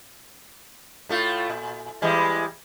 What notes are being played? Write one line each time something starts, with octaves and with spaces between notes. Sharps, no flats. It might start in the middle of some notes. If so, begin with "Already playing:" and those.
A2 A3 F4
A#2
E3 G3 G#3